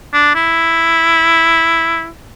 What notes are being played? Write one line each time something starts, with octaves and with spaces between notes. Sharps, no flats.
D4
E4